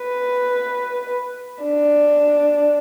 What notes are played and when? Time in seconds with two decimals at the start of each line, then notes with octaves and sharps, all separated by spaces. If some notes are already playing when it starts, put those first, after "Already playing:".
Already playing: B4
1.63 D4